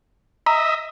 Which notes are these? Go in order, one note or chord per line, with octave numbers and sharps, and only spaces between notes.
D#5 E5 A#5